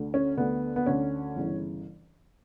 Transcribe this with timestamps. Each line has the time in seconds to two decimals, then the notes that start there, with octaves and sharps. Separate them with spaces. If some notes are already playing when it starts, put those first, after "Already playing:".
Already playing: D2 D3
0.14 C#4
0.37 D2 D3 B3
0.76 B3
0.86 D2 D3 C#4
1.36 G1 C#3 E3